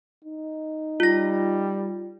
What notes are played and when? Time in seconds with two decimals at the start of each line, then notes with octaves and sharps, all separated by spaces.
0.25 D#4
1.00 G3 F4 A#6